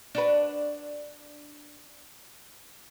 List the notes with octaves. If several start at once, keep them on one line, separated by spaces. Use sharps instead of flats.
D4 F#4 B4